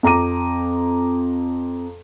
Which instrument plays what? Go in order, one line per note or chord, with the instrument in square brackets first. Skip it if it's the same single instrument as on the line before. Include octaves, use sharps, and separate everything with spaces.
[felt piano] F2 A#5 D6 D#7